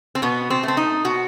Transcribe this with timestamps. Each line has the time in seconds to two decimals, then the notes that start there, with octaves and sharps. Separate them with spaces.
0.15 C4
0.22 B2 B3
0.50 C4
0.63 A3 C4
0.77 D#4
1.05 B2 F#4